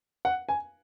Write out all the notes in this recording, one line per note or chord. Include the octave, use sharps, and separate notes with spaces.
F#5
G#5